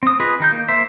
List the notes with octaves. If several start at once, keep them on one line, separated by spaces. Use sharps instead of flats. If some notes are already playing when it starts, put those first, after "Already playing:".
C4 D#6
F4 G#4 B4 D#5
D#3 D#4 G6
A#3
A#3 C5 E5